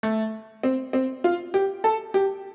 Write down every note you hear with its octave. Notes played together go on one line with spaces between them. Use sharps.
A3
C4
C4
F4
G4
A4
G4